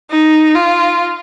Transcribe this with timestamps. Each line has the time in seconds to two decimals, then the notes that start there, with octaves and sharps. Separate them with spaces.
0.11 D#4
0.56 F4